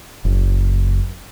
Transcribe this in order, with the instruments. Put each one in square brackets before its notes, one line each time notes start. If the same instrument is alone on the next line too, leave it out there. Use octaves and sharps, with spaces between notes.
[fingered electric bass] F#1